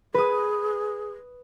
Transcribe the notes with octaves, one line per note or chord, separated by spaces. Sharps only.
G#4 B4 D#6